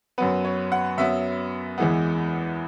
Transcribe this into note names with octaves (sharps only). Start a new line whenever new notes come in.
F#2 F#3 B3 B4
C#5
F#5
F#2 F#3 B3 E5
E2 E3 G#3 B3